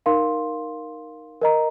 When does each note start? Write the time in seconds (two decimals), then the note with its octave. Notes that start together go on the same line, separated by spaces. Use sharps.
0.06 D#4 A#4 F5 C6
1.41 A#4 D#5 A#5